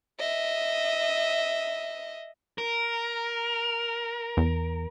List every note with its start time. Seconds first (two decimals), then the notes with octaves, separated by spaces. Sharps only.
0.19 D#5 E5
2.58 A#4
4.37 E2